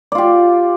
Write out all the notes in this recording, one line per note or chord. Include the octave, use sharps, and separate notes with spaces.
F4 G4 D5